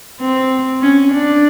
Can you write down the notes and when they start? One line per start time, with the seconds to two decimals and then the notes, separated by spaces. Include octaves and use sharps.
0.20 C4
0.81 C#4
1.12 D4